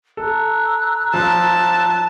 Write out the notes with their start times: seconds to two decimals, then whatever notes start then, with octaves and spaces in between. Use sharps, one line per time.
0.17 A4 A#5 E6 F#6
1.14 F3 A5